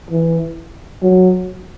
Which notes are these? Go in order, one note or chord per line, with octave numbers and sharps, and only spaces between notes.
E3
F#3